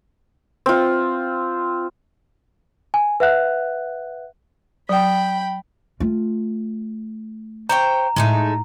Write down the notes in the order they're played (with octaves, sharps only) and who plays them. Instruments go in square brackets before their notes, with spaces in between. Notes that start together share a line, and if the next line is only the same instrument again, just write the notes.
[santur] C4 F4
[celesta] G#5
B4 E5 F#5 F#6
[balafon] F#3 [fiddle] G5 B5
[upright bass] A3 F4
[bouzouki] C5 C#5 G5 [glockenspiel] A#5
[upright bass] A2 [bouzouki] G#3 A3 D#4